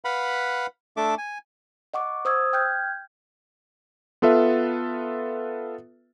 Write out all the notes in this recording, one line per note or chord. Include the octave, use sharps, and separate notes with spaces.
B4 F5 F#5 B5
A3 D4 A4 E5 D6
G#5
D#5 F#5 C#6 D6
C5 D#6 E6 G#6
G5 F6 G6 G#6
B3 F4 A4 B4 E5